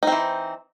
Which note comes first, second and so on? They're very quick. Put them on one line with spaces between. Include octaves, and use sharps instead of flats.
D#4 C4 E3